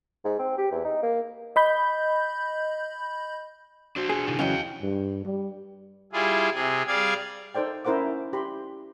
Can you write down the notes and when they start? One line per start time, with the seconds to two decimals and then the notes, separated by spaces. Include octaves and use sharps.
0.25 G#2
0.39 C4
0.58 G4
0.71 E2
0.85 D#4
1.03 A#3
1.56 D#5 B5 G6
3.96 D4 F#4 C5
4.09 G#4
4.27 C3 D#3 D4 E4
4.39 C#3 E3 F#3 F#4 D#5 F5 G5
4.82 G2
5.25 G3
6.13 G3 E4 F4 G#4
6.54 C3 G#4
6.88 G3 G#4 D5 F5 G#6
7.55 D#4 A4 C5 D5 G5
7.85 C#4 E4 A#4 C5 F#5 D6
8.32 E4 G4 B5 C6